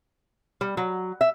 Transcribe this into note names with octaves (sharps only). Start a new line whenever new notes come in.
G3
F#3
E5